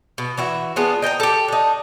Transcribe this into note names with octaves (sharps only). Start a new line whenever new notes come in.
B2
E3 F#4 E5
G#3 B3 D4 F4
D#5 G5 A5 A#5
G4 A4
D4 D#4